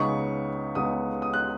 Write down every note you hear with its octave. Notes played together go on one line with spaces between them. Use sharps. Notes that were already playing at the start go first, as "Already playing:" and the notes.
Already playing: C#2 C#3 G#3 B3 D#4 C#6
C#2 C#3 G#3 B3 D#4 D#6
D#6
F#6